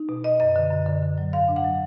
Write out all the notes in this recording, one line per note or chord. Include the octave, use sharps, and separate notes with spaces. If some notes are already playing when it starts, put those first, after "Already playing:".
Already playing: D#4
B2
B2 D#5
F#2 D#5
D3
F#2
D3
D3
F#3
G#2 F5
D4
F#5
F#3